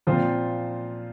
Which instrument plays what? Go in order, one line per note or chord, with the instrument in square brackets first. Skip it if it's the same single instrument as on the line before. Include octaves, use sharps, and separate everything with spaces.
[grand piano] A#2 F3 C4 F4 C5